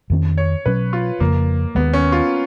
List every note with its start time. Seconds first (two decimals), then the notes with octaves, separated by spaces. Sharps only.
0.10 F2 D#3 A#3 C#4
0.38 C#5
0.66 B2 F#3 C#4 B4
0.93 F4
1.20 F2 C#3 F3 A#3
1.75 D#2 D#3 G#3 B3
1.93 C#4
2.12 F4